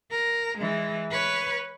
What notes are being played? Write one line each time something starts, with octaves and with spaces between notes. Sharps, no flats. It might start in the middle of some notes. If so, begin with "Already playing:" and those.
A#4
E3 G#3
B4 C#5